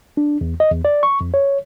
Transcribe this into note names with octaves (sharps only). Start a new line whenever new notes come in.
D4
E2
D#5
E2
D5
C#6
F2
C#5